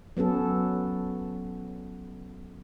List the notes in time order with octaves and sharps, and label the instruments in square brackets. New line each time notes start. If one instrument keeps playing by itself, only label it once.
[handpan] F#3 B3 C#4 A4